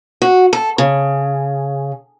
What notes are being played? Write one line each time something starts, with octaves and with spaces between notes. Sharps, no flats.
F#4
A4
C#3